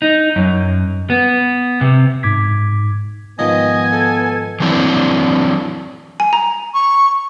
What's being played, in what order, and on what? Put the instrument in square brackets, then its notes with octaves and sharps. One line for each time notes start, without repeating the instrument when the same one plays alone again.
[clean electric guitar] D#4
F#2
B3
C3
[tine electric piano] G#2 D6 G#6 B6
[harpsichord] G#2 D#3 F3 [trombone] B3 [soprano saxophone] D#5 [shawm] G#5
[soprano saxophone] A4
[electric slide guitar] E3 F#3 C4 D4 E4
[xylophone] G#5
A#5
[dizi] C#6